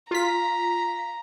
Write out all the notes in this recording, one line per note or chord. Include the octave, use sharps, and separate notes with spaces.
F4 A#5 B6